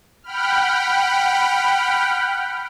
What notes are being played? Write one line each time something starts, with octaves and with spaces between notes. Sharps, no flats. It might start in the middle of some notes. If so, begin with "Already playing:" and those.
F#5 G5 B5 F6